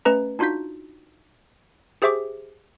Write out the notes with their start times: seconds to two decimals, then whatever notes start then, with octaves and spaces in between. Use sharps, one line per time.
0.05 A3 C#4 B4 D#5 A#5
0.39 D4 D#4 F4 F#4 G6 B6
2.02 G4 G#4 C5 E5 C#6 D6